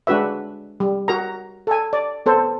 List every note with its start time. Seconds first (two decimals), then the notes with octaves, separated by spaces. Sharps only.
0.07 G#3 D4 F#4 B4 E5
0.80 G3
1.08 F#4 A#4 A#5
1.67 A4 G#5
1.93 D5
2.26 B3 A4 C5